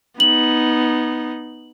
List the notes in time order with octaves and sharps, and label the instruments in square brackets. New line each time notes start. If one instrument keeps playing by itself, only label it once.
[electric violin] B3 D#4 [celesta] F#7